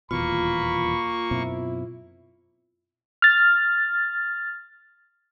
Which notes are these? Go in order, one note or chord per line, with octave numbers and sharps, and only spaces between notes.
D#1 E2 B2 A#3 F4 B5 C#6
F#2 B2 C4 E4
F6 A6